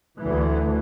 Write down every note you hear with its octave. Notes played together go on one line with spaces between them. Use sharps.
D2 E3